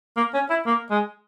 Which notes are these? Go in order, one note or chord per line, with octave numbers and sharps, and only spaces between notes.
A#3
C#4
E4
A#3
G#3